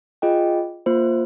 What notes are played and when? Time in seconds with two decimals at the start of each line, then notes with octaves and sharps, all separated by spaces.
0.22 F4 G#4 D#5 G5
0.86 A#3 F4 C5